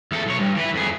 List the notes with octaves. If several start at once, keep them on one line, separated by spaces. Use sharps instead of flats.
E2 A4
B1 C#5
G2
E3 B4
F2 G#4